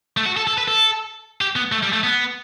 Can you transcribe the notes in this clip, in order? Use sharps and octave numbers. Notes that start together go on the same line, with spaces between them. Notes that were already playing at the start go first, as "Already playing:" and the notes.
A3
F#4
A4
A4
B4
A4
G4
B3
A3
G3
A3
B3